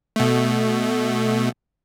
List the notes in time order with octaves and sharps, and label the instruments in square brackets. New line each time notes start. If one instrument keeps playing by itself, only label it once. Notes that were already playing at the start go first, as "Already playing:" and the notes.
[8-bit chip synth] B2 A3